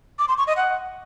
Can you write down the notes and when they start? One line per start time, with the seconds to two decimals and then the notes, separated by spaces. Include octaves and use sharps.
0.19 D6
0.28 C6
0.38 C#6
0.47 D#5
0.57 F#5